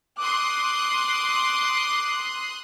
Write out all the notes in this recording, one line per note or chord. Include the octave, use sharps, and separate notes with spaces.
C6 D6 D#6 F#6